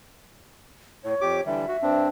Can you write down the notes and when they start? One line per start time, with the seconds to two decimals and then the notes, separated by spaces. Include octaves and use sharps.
1.04 A2 C#5
1.21 F2 G4 D6
1.46 D3 E3 G3 E5
1.68 F#4
1.82 G2 C4 D4